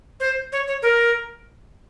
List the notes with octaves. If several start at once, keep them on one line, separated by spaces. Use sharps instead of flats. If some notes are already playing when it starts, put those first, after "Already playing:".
C5
C#5
C#5
A#4